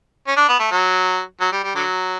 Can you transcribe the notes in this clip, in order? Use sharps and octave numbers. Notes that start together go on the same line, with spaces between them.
C#4
D4
B3
A3
F#3
F#3
G3
G3
D3 F#3